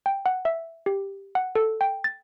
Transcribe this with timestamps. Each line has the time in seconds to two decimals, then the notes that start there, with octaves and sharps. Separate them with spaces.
0.06 G5
0.26 F#5
0.45 E5
0.86 G4
1.35 F#5
1.55 A4
1.81 G5
2.04 A6